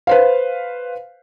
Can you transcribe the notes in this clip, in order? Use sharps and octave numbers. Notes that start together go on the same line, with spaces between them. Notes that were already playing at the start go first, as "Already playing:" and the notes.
B4 C5 F5